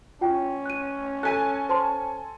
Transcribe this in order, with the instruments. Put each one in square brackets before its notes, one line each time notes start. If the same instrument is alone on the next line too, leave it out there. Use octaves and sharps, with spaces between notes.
[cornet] C#4 [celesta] F4 G5
[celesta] F#6 D#7
[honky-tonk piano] A4 G#5 [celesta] F#6 B6 D#7
[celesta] C5 A5 C6